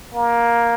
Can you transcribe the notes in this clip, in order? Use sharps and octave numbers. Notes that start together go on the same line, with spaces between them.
A#3